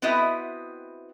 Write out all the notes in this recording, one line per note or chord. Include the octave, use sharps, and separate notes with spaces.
B3 C4 E4 F#4 D#5 E5